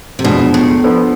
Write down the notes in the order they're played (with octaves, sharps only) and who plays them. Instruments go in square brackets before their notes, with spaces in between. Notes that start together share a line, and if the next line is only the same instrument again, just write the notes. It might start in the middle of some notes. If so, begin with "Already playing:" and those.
[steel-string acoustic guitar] C3
[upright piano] E2 D3 F3 G#3 D4 [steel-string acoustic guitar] B2
[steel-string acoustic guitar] A2
[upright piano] F3 B3 D4 A4 C5